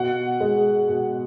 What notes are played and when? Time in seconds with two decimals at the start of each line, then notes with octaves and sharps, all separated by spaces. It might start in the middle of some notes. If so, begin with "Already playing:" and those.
Already playing: B2 F#5
0.40 G#3
0.88 B2